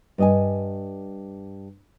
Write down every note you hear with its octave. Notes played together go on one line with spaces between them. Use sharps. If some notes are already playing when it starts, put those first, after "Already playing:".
G2 D#5 G#5